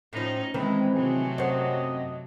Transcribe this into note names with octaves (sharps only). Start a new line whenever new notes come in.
A2 F3 C#4 D#4
D#3 E3 G#3 A3 C4 B4
C3 F#3 A3 G#4
F#2 C4 D#5